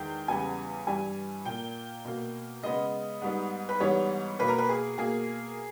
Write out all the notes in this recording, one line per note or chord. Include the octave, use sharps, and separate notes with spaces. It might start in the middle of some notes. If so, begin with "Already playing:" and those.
Already playing: E2 D#3 G#3 G5
E2 C#3 E3 G3 B3 G#5
G2 E3 G3 G#5
A#2 A#3 G5
B2 A#3
C#3 G#3 B3 D#5
G#2 G3 B3
B4
G#2 E3 G3 B3 C#5
B2 A#3 B4
A#4
B4
G#4
B2 A#3 G#4